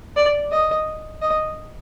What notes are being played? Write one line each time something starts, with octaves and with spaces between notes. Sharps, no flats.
D5
D#5
D#5